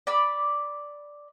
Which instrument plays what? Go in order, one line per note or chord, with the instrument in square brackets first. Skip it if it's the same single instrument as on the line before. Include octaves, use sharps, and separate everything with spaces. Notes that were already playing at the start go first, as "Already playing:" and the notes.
[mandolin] D5 B5